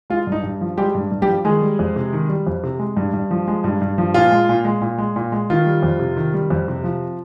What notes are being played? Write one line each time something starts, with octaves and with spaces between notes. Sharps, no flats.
G#3 F4
G2
D#4
G2
F3
G3 G#3 G4
G2
G2
G3 G4
F3
D#3 G#3 G#4
G3
F2
C3
D#3
G3
F2
C3
G#3
G2
G2
F3
G#3
G2
G2
F3
A#2 F4
G#3
A#2
G#3
A#2
G#3
A#2
G#3
D#3 F4
G3
F2
C3
D#3
G3
F2
C3
F3